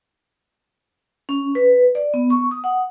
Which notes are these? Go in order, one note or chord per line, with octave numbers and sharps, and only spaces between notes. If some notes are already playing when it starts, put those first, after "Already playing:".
C#4
B4
D5
B3
C#6
D#6
F#5